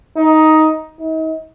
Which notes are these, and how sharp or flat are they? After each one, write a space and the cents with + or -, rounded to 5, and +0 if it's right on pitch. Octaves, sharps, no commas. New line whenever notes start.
D#4 +10
D#4 +40